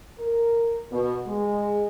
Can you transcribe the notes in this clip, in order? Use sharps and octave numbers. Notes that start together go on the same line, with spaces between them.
A#4
B2
G#3